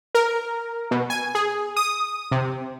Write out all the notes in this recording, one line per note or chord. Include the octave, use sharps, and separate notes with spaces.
A#4
B2
G#5
G#4
D#6
C3